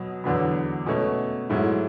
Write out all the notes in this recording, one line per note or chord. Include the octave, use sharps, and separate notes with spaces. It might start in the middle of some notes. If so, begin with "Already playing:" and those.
Already playing: B2 F#3 B3
E2 D3 F#3 B3
B2 A3 C#4
G#2 F#3 A3 E4